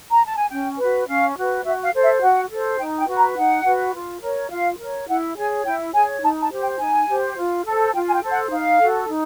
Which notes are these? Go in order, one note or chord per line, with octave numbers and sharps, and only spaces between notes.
A#5
A5
G#5
C#4 G5
F#4 B4
C#4 F5
F#4 B4
F#4 E5
F5
A4 C5
E5
F#4 F#5
A4
C5
D#4 G5
G5
F#4 B4
A#5
D#4 F#5
F#4 B4
F4
A#4 C#5
F4 F5
A#4 C#5
E4 F#5
G#4 C#5 G#5
E4 G5
G#4 C#5 G#5
D#4 A5
A5
G4 C5
G5
D#4 G#5
G4 C5
F4
A4 C5
F4 G5
G#5
G5
A4 C5
F#5
D#4 F5
F#4 A4
D#4